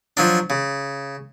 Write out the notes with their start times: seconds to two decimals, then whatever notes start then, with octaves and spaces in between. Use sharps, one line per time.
0.17 F3 F#3 D4
0.50 C#3